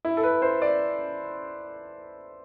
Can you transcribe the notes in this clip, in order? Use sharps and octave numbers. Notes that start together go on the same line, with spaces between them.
E4
A4
B4
C5
D5